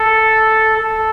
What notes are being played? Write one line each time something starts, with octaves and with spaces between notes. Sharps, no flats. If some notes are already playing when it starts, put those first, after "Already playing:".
Already playing: A4
A4